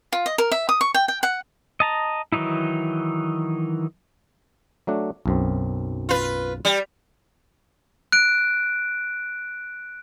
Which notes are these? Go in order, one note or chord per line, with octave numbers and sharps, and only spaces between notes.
F4
D#5
A#4
E5
D#6
C#6
G5
G5
F#5
D#5 A5 A#5
D#3 E3 F#3 D#4 E4
F#3 A3 D4
B1 F#2 C4
F4 B4
G3
F#6 D7